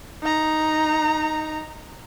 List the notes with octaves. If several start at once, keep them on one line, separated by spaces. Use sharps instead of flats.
D#4 A#5